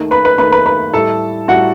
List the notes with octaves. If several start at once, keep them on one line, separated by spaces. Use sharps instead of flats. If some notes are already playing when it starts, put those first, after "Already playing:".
Already playing: D#2 D#3 A3
B4 B5
B4 B5
D#2 D#3 A3 B4 B5
B4 B5
B4 B5
A2 G3 A4 A5
A2 G3 F#4 F#5